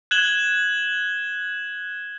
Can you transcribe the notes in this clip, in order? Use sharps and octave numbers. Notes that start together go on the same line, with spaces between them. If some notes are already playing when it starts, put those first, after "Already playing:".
F#6 G#6 E7 F#7 G7